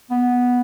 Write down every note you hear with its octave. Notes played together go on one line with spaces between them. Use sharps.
B3